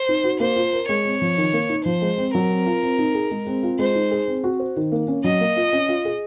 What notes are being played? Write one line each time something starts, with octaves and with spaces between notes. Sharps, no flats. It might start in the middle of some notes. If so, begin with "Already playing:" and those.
Already playing: C5
D#4
F#4
A#3 C5
F4
A#4
G#3 C#5
C4
F3
D#3
A#3
D#4
F3 C5
G#3
C4
F#3 A#4
C4
F4
C4
D#4
G#4
G#3
C4
F4
G#3 C5
D#4
G#4
C4
F#4
C5
D#3
A#3
C#4
F#3 D#5
A#3
F4
C#4
F4
G#4